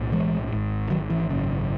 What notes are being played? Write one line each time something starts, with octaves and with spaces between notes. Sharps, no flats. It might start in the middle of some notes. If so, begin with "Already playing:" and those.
Already playing: B1 A2
E3 G#3
G#1 G#2
D#3 F#3
E3
G#1 F#2 C#3